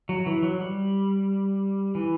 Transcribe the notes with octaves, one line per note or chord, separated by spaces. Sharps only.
F#3
E3
F#3
G3
E3